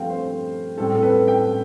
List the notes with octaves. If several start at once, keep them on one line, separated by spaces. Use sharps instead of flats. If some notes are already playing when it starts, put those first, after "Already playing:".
Already playing: G2 F3 A3 C4 F5 G5
C5
A2 G3 C4 A4
A4
B4
G5